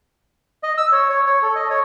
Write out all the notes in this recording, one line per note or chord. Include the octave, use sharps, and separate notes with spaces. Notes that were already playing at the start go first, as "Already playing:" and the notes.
D#5
E6
C#5
C#5
C#5
A4
D#5
C#5